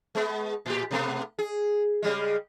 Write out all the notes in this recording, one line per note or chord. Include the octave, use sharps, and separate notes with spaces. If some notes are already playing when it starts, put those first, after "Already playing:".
G#3 B3
A2 G4
B2 A3 B3
G#4
C#3 G3 G#3